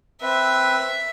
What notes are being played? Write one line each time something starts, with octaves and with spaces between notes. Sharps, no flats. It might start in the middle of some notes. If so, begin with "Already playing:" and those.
C4 B4 E5